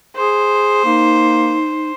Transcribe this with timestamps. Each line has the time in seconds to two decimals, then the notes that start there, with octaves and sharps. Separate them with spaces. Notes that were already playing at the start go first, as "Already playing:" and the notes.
0.16 G#4 C5
0.85 A#3 D#4